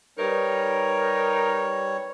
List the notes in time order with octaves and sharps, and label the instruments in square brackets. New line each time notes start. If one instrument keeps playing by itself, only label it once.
[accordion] G3 C#5 [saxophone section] D#4 A#4 [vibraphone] G4 B4